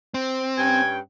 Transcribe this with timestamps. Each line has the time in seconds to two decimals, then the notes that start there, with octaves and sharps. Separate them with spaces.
0.14 C4
0.58 G2 C#4 G5 G#5